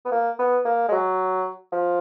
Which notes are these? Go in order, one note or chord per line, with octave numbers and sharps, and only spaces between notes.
B3
A#3
B3
A#3
G#3
F#3
F3